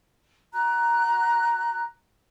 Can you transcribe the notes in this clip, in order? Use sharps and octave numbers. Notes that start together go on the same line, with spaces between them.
F#4 A#5 F#6